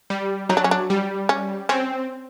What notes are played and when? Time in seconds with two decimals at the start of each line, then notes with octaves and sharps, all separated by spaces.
0.10 G3
0.49 F#3 D#4
0.57 D4
0.64 C#4
0.71 D4
0.90 G3
1.29 C#4
1.69 C4 C#4